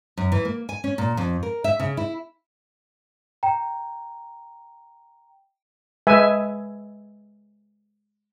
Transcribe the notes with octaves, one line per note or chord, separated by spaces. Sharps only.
F#2
E3
A#3
G#5
C#4
A#2
F2
A#4
E5
C#3
E4
G5 A#5
G#3 B4 E5 G#5